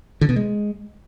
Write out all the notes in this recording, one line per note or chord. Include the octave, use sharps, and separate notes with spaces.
D3
B2
G#3